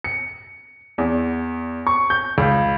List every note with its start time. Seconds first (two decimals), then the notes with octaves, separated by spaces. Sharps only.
0.04 C#7
0.98 E2
1.87 C#6
2.10 G6
2.38 C#2